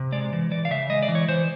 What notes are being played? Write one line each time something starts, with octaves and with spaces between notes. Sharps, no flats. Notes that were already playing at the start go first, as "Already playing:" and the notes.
Already playing: C3
G#3 D5
E3
E3 D5
F5
C#3 E5
G#3 D#5
D5
E3
C#5
E3 C5